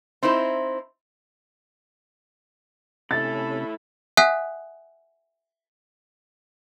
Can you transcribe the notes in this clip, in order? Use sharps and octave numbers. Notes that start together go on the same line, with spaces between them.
C4 D#4 E4 C5
A2 C3 C#4 E4 A4 B5 A6
E5 F#5 G#5 D#6 F#6 B6